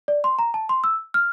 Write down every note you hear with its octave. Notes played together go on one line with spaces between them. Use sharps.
D5
C6
A#5
A5
C6
E6
F6